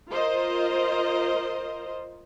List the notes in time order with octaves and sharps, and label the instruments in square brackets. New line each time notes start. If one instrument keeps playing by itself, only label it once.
[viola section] F4 A#4 C5 D#5